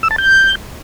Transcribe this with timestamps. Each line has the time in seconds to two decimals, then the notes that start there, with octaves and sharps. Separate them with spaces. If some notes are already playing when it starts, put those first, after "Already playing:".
0.03 E6
0.11 A5
0.18 G6